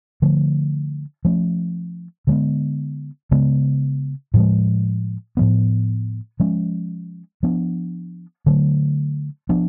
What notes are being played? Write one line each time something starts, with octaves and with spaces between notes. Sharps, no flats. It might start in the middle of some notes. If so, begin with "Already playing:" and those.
D3 F3 A3
F3 A3 C#4
D3 G#3 B3
C#3 G#3 B3
A2 F3 G#3
A2 F3 B3
F3 G#3 C#4
F3 B3 D4
D3 F#3 A3
F3 B3 D4